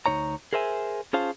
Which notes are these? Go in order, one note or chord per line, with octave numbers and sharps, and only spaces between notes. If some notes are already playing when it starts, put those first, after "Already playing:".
D2 F3 D#4 C#5 A#5
G#4 A#4 C5 E5 G#5
C#4 F4 G#4 C5 F5 A5